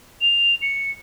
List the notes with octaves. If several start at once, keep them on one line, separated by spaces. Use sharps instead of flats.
F7
C#7